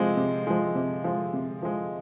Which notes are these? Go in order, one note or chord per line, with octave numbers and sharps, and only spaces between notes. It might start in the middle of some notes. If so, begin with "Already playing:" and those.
Already playing: C3 F3 G#3
C3
F3 G#3
C3
F3 G#3
C3
F3 G#3